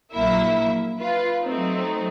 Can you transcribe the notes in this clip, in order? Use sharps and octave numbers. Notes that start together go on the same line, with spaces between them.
A#1 F#3 A#3 E4 E5
F4 B4
F#3 A3 C4 D#4